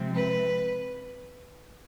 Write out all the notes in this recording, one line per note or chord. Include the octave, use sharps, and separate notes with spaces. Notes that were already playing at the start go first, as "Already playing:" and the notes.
Already playing: C3 F3 G#3 C4
B4